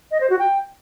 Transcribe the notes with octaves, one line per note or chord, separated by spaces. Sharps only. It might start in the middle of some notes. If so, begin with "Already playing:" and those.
D#5
C5
F#4
G5